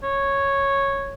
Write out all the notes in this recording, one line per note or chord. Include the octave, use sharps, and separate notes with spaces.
C#5